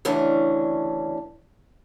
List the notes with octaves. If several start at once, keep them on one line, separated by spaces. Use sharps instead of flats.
D2 C#3 E3 C#4 D4